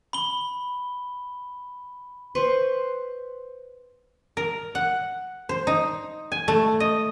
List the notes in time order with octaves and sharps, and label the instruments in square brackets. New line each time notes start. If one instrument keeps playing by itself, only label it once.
[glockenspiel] B5 G7
[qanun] B4 C5 C#6
[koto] A#4
F#5
C5
D#4
G#5
A3
D#5